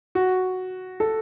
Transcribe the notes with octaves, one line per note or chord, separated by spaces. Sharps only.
F#4
A4